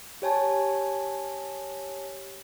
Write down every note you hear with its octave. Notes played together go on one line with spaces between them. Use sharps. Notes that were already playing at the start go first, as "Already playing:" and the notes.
G4 C#5 G#5 A5